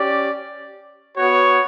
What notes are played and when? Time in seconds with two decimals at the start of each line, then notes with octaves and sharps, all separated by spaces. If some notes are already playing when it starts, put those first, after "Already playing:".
Already playing: C#4 G4 D5
1.15 B3 F#4 C#5